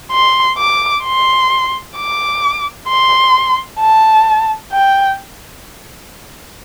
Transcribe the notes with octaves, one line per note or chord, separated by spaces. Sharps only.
C6
D6
C6
D6
C6
A5
G5